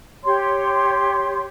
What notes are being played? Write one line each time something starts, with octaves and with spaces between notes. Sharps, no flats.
G4 C#5 C6